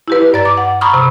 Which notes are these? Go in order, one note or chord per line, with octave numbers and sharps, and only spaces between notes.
E4 G4 B4
G2 D5 A#5 A6
D6
F#5
A#5 B5 C#6 D#6 F6
C3